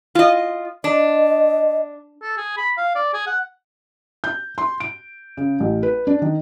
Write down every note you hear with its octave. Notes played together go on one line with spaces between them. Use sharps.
F4 D#5
D4 D#5
A4
G#4
B5
F5
D5
G#4
F#5
G6
C6
D7
C#3
A1
B4
D4
D#3